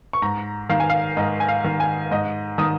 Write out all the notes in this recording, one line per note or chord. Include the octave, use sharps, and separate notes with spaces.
C#6
G#2 A#5
D#3 F5
G#5
F5
G#2 D#5
G#5
F5
D#3
G#5
G#2 D#5
D#3 D#6